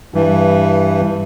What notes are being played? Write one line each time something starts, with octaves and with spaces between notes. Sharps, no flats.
G2 E3